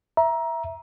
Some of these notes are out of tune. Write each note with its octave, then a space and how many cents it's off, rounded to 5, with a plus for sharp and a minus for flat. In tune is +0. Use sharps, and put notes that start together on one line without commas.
E5 +0 A#5 +20